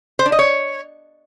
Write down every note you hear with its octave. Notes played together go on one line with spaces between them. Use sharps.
C5
D4
D#5
C#5